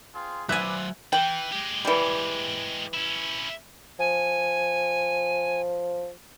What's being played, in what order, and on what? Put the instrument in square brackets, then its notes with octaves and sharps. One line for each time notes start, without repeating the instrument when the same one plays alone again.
[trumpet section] C4 F4 G#4
[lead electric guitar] F#3 C5 [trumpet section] B4 D5 [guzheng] E5 G#5 [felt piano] F#6
[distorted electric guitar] E3 [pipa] G5
[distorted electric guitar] G#3 G4
[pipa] E3 G3
[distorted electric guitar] C#4 E4
[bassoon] F3 [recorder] G#5